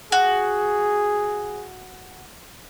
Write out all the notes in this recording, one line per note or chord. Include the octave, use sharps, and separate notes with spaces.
F#4 G#4